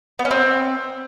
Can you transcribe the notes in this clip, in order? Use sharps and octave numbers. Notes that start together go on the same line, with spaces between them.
B3
C#4
C4